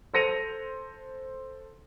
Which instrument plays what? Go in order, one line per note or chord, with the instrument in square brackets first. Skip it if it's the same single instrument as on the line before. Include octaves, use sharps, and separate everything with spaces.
[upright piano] A4 C5 A#6 C#7 D#7 F7